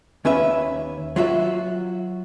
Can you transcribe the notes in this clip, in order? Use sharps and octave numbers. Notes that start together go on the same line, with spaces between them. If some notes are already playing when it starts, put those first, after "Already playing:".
D#2 C#4 B4 E5
F#3 F4 F#4 E5